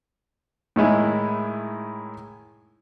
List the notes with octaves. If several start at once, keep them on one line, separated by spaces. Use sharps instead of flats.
A2 D#3 G#3 E4